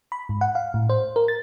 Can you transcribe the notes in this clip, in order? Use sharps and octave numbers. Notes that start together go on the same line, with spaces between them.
B5
G#2
F#5
F5
A2
C5
A#4
A6